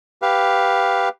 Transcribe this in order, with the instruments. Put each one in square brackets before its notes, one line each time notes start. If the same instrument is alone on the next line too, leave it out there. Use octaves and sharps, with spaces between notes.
[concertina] G4 B4 F5